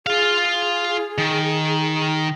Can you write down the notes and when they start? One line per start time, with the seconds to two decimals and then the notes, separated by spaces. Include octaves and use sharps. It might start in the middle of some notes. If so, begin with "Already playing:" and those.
0.07 F4 G#4 F5
1.18 D#3